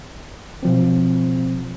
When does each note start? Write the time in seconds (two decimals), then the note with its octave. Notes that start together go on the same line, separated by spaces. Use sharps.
0.63 B2 F3 C4